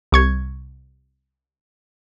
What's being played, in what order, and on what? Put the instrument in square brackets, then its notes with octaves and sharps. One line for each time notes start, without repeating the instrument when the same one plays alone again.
[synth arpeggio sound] C2 C#6 G#6